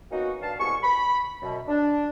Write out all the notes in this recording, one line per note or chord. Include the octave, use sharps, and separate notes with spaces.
A#3 B3 C#4 D#4 F#4
G2 G3 F5 A5
C2 B2 G#3 G#5 C#6
B5
F#2 B2
D4